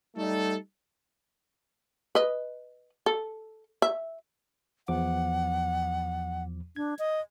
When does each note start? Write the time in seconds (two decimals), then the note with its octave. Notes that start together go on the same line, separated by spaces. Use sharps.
0.16 G3 A3 D#4 A4
2.15 B4 D#5
3.06 A4
3.82 E5
4.88 E2 F3 F#5 D6
6.76 D4 G#6
6.99 D#5